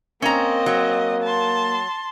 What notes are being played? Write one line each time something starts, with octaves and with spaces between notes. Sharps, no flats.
A#3 C4 C#4 D#5 A#5
F#3
A5 C6